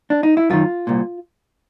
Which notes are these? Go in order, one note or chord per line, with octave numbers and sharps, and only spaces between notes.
D4
D#4
E4
F#2 D#3 F4
C2 A#2